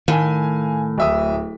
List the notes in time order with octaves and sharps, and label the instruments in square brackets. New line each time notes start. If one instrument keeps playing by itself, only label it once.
[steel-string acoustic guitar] A2 [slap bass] D#3 [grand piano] F5 G#5
[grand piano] D1 E5 D#6